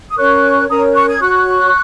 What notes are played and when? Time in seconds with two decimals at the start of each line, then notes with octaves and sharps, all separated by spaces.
0.09 D#6
0.18 C#4 A#4 C#5 C#6 F#6
0.69 C#4 A#4 C#5 A#5 D#6
0.95 C#6 F#6
1.08 D#6 G#6
1.21 F#4 C#5 C#6 F#6